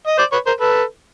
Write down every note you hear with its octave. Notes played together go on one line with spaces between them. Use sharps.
D#5
C5 D5
B4 C#5
A#4 C5
A4 B4